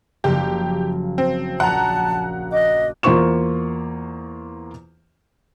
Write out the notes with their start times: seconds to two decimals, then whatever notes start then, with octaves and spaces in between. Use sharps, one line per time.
0.24 F#1 F3 A#3 G4
1.18 C4
1.60 A#1 F#5 A5 A#5
2.52 D#5 D6 F#6
3.03 E2 A#3 F4 C5 C#6 E7